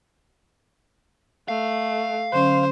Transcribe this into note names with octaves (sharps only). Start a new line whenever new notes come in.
A3 F5
D3 F#3 C#4 C5